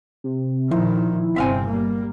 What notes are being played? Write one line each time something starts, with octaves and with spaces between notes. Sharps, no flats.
C3
A#2 D#3 F3 E4
G1 C3 C4 E5 F5 G#5
G3 A#3